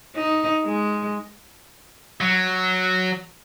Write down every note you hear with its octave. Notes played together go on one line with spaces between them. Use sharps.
D#4
G#3
F#3